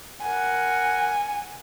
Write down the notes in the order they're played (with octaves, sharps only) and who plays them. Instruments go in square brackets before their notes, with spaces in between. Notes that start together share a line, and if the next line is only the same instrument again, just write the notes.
[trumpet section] A#4 F#5 [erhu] G#5